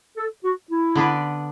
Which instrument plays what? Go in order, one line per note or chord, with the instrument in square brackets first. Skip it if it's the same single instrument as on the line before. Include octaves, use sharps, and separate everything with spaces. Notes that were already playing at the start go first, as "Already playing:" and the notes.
[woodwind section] A4
F#4
E4
[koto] D3 B3 D4 B4